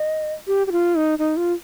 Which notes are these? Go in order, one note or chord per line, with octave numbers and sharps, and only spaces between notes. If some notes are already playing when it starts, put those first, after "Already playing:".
Already playing: D#5
G4
G4
F4
D#4
D#4
F4